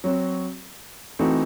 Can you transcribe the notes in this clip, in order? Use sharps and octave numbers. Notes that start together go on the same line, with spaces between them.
F#3 C4 F#4
E3 A3 C4 D#4 F#4